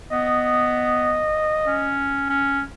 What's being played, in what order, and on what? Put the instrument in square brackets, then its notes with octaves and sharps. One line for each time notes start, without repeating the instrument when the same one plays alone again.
[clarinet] B3 [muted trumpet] D#5
[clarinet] C#4
C#4